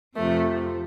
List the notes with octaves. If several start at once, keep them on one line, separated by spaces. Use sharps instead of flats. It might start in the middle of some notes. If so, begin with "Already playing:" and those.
F2 C3 F3 A3